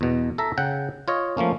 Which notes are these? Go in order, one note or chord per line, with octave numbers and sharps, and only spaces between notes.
E2 B2
A4 E5 A#5
C#3 F#5 G5
F4 C#5 D#5
F3 A3 A#3 C#4